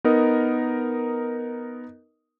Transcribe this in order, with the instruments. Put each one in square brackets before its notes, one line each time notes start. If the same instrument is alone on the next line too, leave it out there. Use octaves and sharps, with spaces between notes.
[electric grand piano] B3 D#4 A#4 D#5